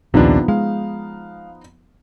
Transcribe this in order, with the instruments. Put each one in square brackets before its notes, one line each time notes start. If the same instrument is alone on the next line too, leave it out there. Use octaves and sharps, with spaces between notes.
[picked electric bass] A#1 D#2 [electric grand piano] C3 D4 [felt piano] F3 B3 D#4
[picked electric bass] G#3 [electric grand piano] F5